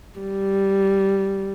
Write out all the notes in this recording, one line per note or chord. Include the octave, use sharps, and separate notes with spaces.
G3